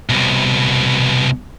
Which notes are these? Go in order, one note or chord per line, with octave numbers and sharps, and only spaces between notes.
C2 B2